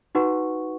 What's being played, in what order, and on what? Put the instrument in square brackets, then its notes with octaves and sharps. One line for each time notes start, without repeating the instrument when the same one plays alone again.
[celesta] D#4 F#4 B4 F#5 C#6